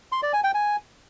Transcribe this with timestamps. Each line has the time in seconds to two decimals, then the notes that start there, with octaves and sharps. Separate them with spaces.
0.12 C6
0.23 D5
0.33 G#5
0.44 G5
0.54 G#5